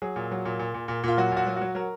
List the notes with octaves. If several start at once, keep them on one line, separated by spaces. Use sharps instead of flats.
F#3 G#4
A#2
F#3
A#2
A#2
A#2
A#2
A#2 F4
F#3 F#4
A#2 F#4
F#3
F#4
F#3
F#3 A#4